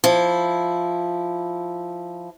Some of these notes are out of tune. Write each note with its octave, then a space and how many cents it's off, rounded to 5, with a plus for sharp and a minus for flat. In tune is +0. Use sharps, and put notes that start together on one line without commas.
F3 +0 E4 +0